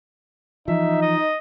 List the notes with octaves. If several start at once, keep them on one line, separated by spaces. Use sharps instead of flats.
E3 F3 D#4 E5
D#5